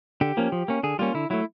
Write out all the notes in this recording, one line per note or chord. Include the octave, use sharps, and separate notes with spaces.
D3 G4
F3 A#3 C#4
F3
A#3 C#4
D3 G#4
G3 A#3 C#4 F4
D3 E4
F#3 A3 E4